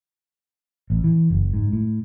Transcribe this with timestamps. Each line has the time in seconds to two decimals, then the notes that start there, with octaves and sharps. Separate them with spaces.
0.90 A1
1.04 E3
1.30 F#1
1.54 G#2
1.73 A2